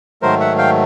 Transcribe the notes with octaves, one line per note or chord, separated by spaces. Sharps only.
G#2 D#3 F#3 A3 A#4 C5
E5 F#5
F5 G5